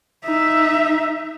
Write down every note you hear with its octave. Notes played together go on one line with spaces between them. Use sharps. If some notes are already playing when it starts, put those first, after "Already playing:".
D#4 E5